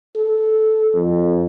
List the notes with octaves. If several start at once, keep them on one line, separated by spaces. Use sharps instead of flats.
A4
F2